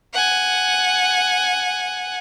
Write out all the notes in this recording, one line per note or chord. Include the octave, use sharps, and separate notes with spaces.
F#5 G#5